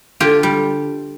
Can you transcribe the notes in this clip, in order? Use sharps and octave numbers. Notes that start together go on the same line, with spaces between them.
D3 F4 G4
G3